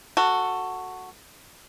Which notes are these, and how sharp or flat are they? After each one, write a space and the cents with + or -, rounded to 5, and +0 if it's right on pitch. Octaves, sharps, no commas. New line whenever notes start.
F#4 +0 A4 +20